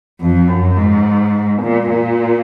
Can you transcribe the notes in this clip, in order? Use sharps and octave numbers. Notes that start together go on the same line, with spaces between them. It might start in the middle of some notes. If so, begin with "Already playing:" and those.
F2
F#2
G#2
A#2
A#2